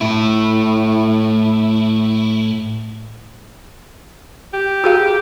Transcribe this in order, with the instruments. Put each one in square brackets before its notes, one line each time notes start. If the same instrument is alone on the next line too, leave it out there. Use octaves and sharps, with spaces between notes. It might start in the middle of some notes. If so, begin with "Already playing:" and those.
[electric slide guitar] A2 E4
[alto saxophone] G4
[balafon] F#4 G#4 F5